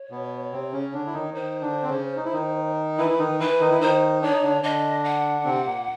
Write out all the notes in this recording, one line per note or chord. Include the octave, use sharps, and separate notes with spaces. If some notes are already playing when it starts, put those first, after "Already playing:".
Already playing: C#5
B2 B3
C3 C4
C#3 C#4
D3 D4
E4
D#3 D#4
D#3 D#4 C5
D3 D4
C4
C#3 C#4
D#4
E4
D#3 D#4
E3 E4 B4
E4
D#3 D#4
E3 E4 B4
D#3 D#4
E4
D#3 D#4 C5
D4 C#5
D#4
D3 D4
D3 D4 D#5
F#5
C3 C4
A#2 A#3